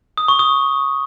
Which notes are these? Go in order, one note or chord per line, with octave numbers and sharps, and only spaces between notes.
D#6
C#6
D#6